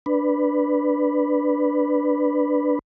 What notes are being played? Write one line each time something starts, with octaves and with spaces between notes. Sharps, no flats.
D4 B4